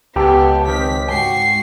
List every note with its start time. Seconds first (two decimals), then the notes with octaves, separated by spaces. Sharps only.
0.16 C#2 B3 G4 A4
0.68 D#3 C4 B6
1.08 G#2 F#3 F#4 G5 C#6 C7